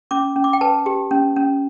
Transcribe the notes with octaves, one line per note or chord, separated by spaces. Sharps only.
C#4 D6
C#4
D6
G5
B4 A5
G4
C#4
C#4